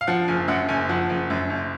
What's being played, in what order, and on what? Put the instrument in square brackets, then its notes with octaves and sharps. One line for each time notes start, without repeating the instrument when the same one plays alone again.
[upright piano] F5
F3 F#5
F#1 G#5
F#2 F#5
F#1 G#5
F3 F#5
F#1
F#2
F#1